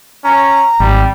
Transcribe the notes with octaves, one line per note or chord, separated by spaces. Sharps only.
C#4 A#5
G#1 G3